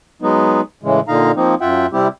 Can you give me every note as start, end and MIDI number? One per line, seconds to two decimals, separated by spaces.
0.22 0.61 54
0.22 0.61 56
0.22 0.61 59
0.22 0.61 63
0.83 1.00 45
0.83 1.00 49
0.83 1.00 52
0.83 1.00 56
1.08 1.32 46
1.08 1.32 50
1.08 1.32 63
1.08 1.32 77
1.08 1.32 82
1.36 1.55 53
1.36 1.55 58
1.36 1.55 60
1.36 1.55 63
1.61 1.86 42
1.61 1.86 65
1.61 1.86 76
1.61 1.86 78
1.61 1.86 79
1.93 2.08 48
1.93 2.08 55
1.93 2.08 60
1.93 2.08 64
1.93 2.08 67